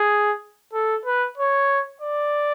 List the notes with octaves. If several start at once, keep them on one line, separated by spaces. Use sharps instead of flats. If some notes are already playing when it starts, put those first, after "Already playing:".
Already playing: G#4
A4
B4
C#5
D5